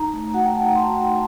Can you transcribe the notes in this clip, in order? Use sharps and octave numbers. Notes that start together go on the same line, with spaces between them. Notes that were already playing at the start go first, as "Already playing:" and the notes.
Already playing: D#4 A#5
A3
F#4 F#5
G5
F#4 A5
A#5
F#4 C6
F#4